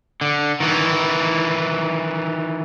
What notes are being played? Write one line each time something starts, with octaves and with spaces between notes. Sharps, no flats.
D3
D#3 E3